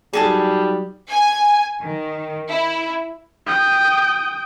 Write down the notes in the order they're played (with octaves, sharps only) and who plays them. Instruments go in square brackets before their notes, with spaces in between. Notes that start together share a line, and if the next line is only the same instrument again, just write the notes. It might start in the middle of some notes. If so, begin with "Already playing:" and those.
[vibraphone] F#3 D#4 F#4 [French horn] G3 [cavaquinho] G#4 A4 A5
[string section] G#5
D#3
E4
[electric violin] G5 D#6